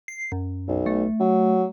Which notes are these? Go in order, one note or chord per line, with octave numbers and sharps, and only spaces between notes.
C7
F#2
B1
A3
F#3